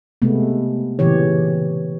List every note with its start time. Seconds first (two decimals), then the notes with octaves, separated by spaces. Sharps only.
0.22 C3 G#3 A3 B3
0.99 A#2 C#3 E3 G4 C#5